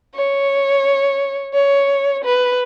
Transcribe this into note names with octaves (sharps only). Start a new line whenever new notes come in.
C#5
C#5
B4